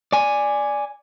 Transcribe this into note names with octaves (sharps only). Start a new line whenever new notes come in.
D5 G#5